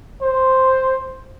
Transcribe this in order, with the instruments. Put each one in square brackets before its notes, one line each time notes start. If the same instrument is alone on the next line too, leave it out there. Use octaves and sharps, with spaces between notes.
[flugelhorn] C5